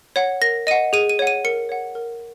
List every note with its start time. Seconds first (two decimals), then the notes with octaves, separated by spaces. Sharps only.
0.16 C#5 F#5
0.41 A#4 A#6
0.67 D#5 F#5 D#7
0.93 G#4 D#7
1.09 D#7
1.19 C#5 F#5
1.27 D#7
1.45 A#4 C#7
1.69 C#5 F#5
1.95 A#4